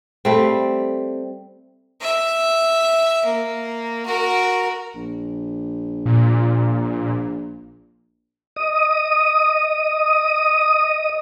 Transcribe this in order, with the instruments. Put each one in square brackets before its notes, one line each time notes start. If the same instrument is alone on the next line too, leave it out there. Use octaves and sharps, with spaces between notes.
[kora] G3 A3 C4
[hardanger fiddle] E5
A#3
F#4 A#4
[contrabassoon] A#1
[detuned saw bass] A#2
[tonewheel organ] D#5 D#6